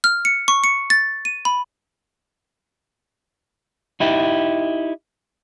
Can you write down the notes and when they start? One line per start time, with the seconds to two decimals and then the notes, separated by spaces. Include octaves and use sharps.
0.04 F6
0.25 C#7
0.48 C#6
0.64 C#7
0.90 A6
1.25 D#7
1.45 B5
4.00 D#4 E4 G4